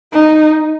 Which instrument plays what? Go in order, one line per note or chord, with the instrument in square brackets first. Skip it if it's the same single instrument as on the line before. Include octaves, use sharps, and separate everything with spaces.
[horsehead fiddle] D#4